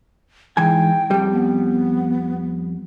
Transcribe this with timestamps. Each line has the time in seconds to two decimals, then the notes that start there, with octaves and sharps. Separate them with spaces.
0.57 G#2 E3 G5 G#5
1.11 F2 G3
1.33 B3